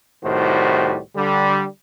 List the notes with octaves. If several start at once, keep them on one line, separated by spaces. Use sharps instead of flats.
C2 A2 D#3 G3 F#4 C5
D3 G3